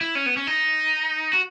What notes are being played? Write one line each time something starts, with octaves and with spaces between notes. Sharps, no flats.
E4
C#4
B3
C#4
D#4
F#4